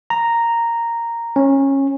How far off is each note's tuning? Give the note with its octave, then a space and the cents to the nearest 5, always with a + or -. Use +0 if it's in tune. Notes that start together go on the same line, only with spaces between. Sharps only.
A#5 -5
C#4 -20